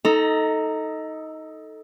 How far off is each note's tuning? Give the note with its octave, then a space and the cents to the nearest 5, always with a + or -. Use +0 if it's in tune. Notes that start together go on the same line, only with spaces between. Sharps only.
D#4 +15 A4 +0 A#5 -10